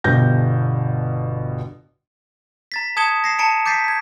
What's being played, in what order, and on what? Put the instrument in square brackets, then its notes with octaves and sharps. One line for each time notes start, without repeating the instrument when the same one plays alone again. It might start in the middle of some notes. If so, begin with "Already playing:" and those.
[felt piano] G1 B2 G3 G6 A#6
[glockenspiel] A#5 A6 B6
A5 D#6 G#6 C#7 E7 G7
A#6 C7 E7
A5 A#5 C#7 D7 E7
D6 G6 A6 B6 C7 D#7
G#6 B6